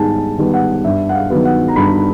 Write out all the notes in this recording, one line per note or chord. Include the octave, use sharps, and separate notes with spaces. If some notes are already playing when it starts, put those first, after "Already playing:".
Already playing: G#2 D#3 G3 B3 G#5 A5
D#3 G3 B3
F#5
G2 E5
F#5
F5
D#3 F#3 B3
F#5
A#5
G2 B5